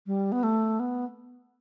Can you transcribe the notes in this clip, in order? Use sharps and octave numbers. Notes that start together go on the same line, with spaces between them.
G3
B3
A3
B3